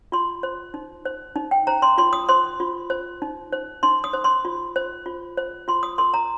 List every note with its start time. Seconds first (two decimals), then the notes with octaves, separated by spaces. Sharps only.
0.12 F4 C6
0.43 C5
0.74 D#4
1.05 C5
1.36 D#4
1.51 G5
1.67 C5 A#5
1.82 C6
1.98 F4 C6
2.13 D#6
2.29 C5 C6
2.60 F4
2.90 C5
3.22 D#4
3.52 C5
3.83 D#4 C6
4.04 D#6
4.13 C5
4.24 C6
4.45 F4
4.76 C5
5.06 F4
5.38 C5
5.68 F4 C6
5.83 D#6
5.98 A#4 C6
6.14 A#5